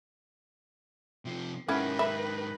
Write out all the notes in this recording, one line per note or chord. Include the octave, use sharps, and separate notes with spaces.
C3 F3
G#2 D#3 C#4 E4 G4 B4 F#5
E5 B5